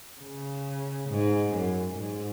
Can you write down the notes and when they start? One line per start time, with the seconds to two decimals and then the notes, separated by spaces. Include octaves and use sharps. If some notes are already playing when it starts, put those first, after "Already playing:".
0.21 C#3
1.09 G#2
1.53 F#2
1.97 G#2